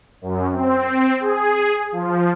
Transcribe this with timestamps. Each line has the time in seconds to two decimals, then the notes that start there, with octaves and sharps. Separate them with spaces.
0.22 F#2
0.52 C4
1.20 G#4
1.92 F3